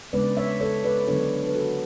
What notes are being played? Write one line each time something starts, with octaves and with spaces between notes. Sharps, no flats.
C#3 G#3 B3 D4 B4 D5
C#5 E5
A4 C#5
B4 D5
D3 F#3 B3 D4 A4 C#5
B4
F#4 A4